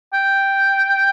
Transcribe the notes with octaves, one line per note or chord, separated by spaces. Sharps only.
G5